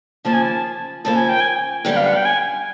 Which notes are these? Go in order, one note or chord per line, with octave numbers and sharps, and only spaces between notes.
D#2 C#3 F3 A#3 A5
G#5
A5
D#2 C#3 F3 A#3 A5
G#5
G5
G#5
F#2 D3 G3 B3 G5
F5
F#5
G5
G#5